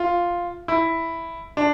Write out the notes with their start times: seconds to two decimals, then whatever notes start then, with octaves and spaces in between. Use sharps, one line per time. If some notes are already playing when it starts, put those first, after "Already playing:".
Already playing: F4
0.68 E4
1.57 D4